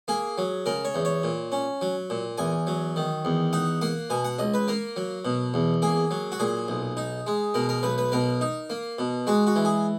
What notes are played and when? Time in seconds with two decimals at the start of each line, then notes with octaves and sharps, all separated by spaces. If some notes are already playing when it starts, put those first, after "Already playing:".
0.08 A#3 G#4
0.38 F#3
0.66 C#3 A#4
0.85 C#5
0.95 E2
1.05 C#5
1.23 A#2
1.52 C#4
1.81 F#3
2.10 A#2
2.38 E2 G#5
2.67 F#3
2.96 D#3
3.25 E2
3.53 D#4 F#5
3.82 A#3 F#5
4.10 B2 G#5
4.25 F#5
4.39 C#2 D#5
4.54 B4
4.68 A#3 A#4
4.96 F#3
5.25 B2
5.54 E2
5.82 A#3 G#4
6.11 F#3
6.32 F#4
6.40 A#2 G#4
6.68 B1
6.97 D#4
7.27 G#3
7.54 B2 A#4
7.69 A#4
7.83 B1 B4
7.98 B4
8.12 B2 A#4
8.41 D#4
8.70 A#3
8.99 B2
9.27 G#3 F#4
9.47 F#4
9.56 E3
9.65 G#4